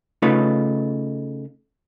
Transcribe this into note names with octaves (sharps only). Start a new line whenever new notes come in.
C#3 A3 D#4 F4 B4